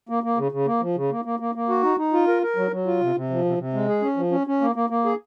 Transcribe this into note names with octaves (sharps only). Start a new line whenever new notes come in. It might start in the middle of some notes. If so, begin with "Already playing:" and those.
A#3
A#3
C#3
C#3
A#3
F3
C#3
A#3
A#3
A#3
A#3
F#4
D#4
D#4
F4
A#4
A#4
F#3
F#3
F4
C3
C3
F3
C3
C3
G#3
G#4
C#4
F3
C#4
C#4
A#3
A#3
A#3
G#4